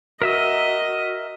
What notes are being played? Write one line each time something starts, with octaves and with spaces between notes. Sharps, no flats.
F#4 A#4 D#5 E5 E6